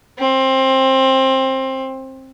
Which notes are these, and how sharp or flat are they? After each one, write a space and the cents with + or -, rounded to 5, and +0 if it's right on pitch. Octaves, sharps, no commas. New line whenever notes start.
C4 +20